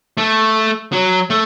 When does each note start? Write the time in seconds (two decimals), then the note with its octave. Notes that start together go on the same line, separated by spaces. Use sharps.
0.17 A3
0.92 F#3
1.30 A3